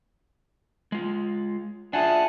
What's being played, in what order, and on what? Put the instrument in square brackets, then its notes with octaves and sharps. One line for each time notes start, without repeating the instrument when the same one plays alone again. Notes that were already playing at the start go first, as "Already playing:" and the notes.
[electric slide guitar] G#3 F4
[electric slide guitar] D4 F4 G#4 [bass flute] E5 [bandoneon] F#5 G#5 A5